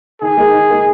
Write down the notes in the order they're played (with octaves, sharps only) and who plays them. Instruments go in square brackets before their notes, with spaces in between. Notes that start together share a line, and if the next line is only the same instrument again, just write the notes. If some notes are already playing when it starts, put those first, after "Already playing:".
[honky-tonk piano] D#3 [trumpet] G#4
[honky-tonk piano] G#3 D#4 A#4
D#3
G#3 D#4 A#4